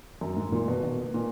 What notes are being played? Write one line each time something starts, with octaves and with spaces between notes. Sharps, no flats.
F#2
G#2
A#2
B2
B2
A#2